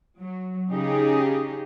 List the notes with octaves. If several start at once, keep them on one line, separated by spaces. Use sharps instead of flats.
F#3
C#3 D#4 G4 G#4